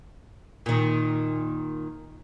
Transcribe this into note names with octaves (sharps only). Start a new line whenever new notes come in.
A#2 D#3